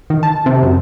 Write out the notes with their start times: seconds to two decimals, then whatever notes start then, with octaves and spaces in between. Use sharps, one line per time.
0.10 D#3
0.23 A5
0.46 C3
0.63 F#2